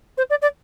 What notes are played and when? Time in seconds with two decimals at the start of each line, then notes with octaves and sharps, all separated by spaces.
0.17 C5
0.30 D5
0.42 D5